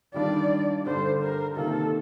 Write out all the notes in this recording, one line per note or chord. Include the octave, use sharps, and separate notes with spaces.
D#3 G3 D4 F4 D5
G2 D3 G3 C5
A#4
C3 D#3 A#3 F4 A4